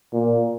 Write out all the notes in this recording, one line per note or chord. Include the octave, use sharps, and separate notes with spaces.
A#2